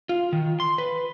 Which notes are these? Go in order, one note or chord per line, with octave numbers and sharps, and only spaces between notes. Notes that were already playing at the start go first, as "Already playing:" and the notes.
F4
D#3
C6
B4